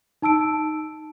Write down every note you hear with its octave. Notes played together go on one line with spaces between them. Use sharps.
D#4 A5 E6 D7